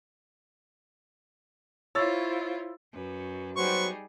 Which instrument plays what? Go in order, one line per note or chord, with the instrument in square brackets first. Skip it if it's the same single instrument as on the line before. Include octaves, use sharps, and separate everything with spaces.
[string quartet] E4 F4 C5 [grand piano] C#5 E6 A6
[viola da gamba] F#2 B4
[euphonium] F#3 [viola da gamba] G3 D#4 G#4 [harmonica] B3 C5 C#6